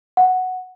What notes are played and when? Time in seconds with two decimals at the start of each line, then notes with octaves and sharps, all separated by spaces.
0.17 F#5